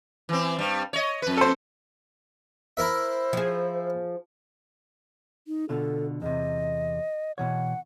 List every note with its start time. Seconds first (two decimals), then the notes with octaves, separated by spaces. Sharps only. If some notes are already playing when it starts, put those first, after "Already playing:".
0.29 E3 C4
0.58 G2 G3
0.93 C#5 D#5
1.22 F2 B4
1.37 A4 C5
2.77 E4 A#4 C5 E5
3.33 F3 G#4
5.47 D#4
5.69 B2 D3 F4 A4
6.22 E2 C3 D#5
7.38 B2 E3 C#5 F#5